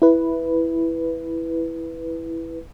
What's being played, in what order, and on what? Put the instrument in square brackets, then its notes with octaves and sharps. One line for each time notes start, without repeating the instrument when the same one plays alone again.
[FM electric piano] E4 B4